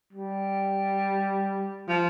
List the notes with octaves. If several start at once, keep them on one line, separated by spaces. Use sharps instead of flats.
G3
F3